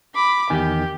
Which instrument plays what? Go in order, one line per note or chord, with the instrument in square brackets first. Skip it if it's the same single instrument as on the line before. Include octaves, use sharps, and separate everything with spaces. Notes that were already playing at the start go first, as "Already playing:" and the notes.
[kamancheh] B5 D6
[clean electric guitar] E2 D#3 G#5 [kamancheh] G4